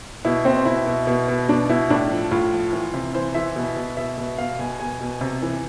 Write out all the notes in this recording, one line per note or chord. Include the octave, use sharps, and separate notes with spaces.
B2 E4
B2 C4
B2 E4
B2
B2
B2
B2 D4
B2 E4
A2 D4
F3
A2 F4
F3
E3
C3
E3 C5
E3 E5
B2
B2
B2 E5
B2
B2 F5
B2 G#5
B2 G#5
B2
C3
E3